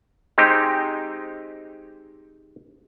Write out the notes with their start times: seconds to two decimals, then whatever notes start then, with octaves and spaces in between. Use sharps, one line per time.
0.38 G#3 C4 D#4 G4